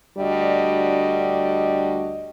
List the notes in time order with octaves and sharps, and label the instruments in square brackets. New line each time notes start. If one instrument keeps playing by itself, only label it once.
[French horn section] D2 G3 D4 F#4 D#5